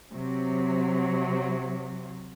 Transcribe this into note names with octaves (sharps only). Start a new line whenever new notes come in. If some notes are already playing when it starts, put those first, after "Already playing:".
C3 F#3